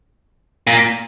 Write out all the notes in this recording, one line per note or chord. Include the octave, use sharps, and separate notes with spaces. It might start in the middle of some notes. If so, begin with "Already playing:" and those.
A#2